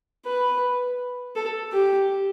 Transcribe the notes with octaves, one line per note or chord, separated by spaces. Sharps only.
B4
A4
G4